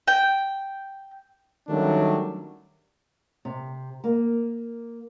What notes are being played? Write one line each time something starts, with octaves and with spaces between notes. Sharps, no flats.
G5
D#3 F#3 G3 A3 C#4 D4
C3
A#3